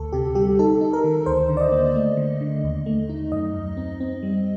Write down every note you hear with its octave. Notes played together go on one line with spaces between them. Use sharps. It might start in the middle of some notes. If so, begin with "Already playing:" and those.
Already playing: D2 A4
C3 G4
G3 G4
D#4 A4
D#4
A#4
D#3
D2 C5
D3
D5
D#5
A#3
A3
D3
D3
D#2
A3
D#4
F#2 D#5
F#2
C4
C4
G3